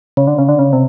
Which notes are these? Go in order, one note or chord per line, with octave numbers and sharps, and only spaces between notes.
C#3
D3
C#3
D3
C#3
C3